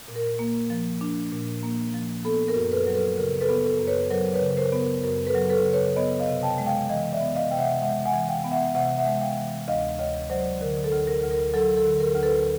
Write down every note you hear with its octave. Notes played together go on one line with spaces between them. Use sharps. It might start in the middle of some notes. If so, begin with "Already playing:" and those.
A#2
A#4
A#3
F3
D4
A#2
A#3
F3
B3 A4
A#4
F#2
A4 B4
F#3
A4 B4
C#3 A#4
A4 B4
B3
A4
F#2
B4 C#5
F#3 A#4 C5
B4 C#5
C#3
A#4 C5
B3
A#4
F#2 A#4
A4 B4
F#3
A4 B4
C#3
B4 C#5
B3 C#5 D#5
D#5 F5
C3
G5 A5
G#3
F5 G5
E3 D#5 F5
D5 E5
B3
D#5 F5
C3 G5
E5 F#5
G#3 E5 F#5
F#5 G#5
E3
F5 G5
B3
E5 F#5
C3 E5 F#5
E5 F#5
G#3
F5 G5
E3
D2 D#5 F5
D2 C#5 D#5
F#3 C5 D5
D3 A#4
A4
D2
A#4
D2
A#4
F#3 A4
A4
D3
A#4
D2
A4 B4